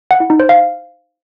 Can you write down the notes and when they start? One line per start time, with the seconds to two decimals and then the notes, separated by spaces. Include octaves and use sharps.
0.11 F#5
0.20 E4
0.30 D#4
0.40 C5
0.49 F5